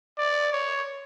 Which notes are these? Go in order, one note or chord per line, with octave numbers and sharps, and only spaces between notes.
D5
C#5